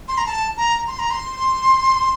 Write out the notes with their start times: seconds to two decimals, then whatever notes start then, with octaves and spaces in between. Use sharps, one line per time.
0.08 C6
0.18 A#5
0.26 A5
0.57 A#5
0.88 C6
0.99 A#5
1.10 C6